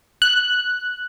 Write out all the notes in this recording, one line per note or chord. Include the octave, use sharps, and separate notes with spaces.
F#6